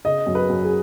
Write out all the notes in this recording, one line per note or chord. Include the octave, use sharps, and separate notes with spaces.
C#3 D#5
F#2
B4
F#2
G#4